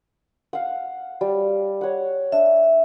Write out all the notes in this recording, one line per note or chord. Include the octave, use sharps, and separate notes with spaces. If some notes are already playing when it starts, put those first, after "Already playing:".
F5 F#5
G3
C#5 F#5
D4 E5